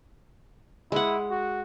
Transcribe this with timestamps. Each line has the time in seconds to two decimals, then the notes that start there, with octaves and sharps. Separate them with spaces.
0.92 G#3 E4 F#5
1.30 F#4